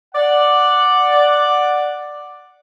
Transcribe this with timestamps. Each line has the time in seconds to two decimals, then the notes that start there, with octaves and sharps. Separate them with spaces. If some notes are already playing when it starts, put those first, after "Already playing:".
0.14 D5 F#5